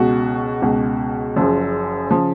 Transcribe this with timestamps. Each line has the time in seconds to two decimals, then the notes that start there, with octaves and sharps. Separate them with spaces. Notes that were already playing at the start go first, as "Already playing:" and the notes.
Already playing: C#2 B2 F#4
0.62 C#2 B2
1.36 F#1 F#2 C#3 F3
2.11 C#3 F3